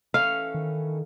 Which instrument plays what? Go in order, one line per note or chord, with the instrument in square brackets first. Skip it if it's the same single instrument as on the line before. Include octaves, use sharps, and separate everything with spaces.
[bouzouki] E3 C#4 A4 [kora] F5
[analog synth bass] D#3